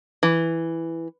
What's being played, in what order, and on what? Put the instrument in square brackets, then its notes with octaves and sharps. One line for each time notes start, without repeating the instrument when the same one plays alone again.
[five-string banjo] E3